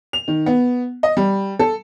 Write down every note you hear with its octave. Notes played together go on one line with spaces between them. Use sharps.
F7
D#3
B3
D#5
G3
A4